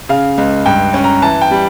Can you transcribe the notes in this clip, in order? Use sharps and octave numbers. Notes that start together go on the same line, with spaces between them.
C#3 F5
C#2
G2 G5
C#4
A#5
E3 A5
G5
G3